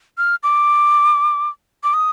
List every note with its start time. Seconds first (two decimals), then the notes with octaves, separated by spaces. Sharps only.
0.18 F6
0.43 D6
1.84 D6
1.94 D#6